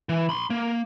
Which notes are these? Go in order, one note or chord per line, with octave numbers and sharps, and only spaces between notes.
E3
B5 C6
A#3